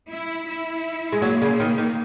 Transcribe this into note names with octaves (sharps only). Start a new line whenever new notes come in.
E4
E4
G#3
F#3 A#3
C#3
D#3
D#3